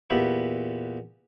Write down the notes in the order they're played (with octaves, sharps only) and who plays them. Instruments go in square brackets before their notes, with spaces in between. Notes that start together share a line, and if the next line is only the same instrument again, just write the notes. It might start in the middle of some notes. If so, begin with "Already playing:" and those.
[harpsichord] E2 A#2 B3 G4 E5 B5